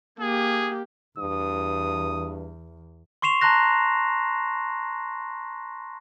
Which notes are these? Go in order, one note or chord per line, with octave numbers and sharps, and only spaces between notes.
A#3 G4 G#4
E2 G2 D#6
C6 C#6 C7 E7 F7
A5 A#5 C6 F#6 A#6